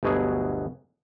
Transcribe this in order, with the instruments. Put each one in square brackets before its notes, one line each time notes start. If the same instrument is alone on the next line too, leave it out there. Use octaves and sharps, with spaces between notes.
[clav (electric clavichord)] G1 D2 B2 F#3 G#4